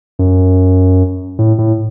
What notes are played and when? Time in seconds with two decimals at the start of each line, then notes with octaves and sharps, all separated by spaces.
0.19 F#2
1.39 A2
1.58 A2